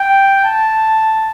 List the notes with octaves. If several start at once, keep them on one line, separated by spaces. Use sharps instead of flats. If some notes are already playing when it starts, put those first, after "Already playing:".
Already playing: G5
A5